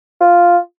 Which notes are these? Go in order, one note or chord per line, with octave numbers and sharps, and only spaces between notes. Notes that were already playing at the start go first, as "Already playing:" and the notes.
F4